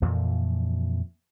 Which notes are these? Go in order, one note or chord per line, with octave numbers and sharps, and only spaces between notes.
F2 A#2 E3 F3